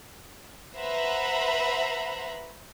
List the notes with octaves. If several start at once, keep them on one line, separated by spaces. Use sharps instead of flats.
B4 C5 E5 F#5 A#5 B5